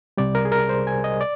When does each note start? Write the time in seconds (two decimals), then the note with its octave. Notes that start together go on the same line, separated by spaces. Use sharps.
0.17 C2 C3 G3 D5
0.35 A#4
0.45 G#4
0.52 A#4
0.69 C5
0.87 G#5
1.04 D#5
1.21 D5